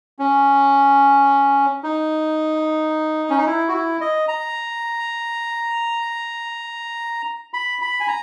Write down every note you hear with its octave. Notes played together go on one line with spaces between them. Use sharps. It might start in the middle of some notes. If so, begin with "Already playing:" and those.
C#4
D#4
C#4
D#4
E4
F#4
E4
D#5
A#5
B5
B5
G#5
A#5